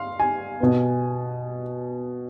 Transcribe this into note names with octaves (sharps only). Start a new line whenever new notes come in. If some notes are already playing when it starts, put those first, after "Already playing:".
Already playing: F5 C6
G#5
B2 B3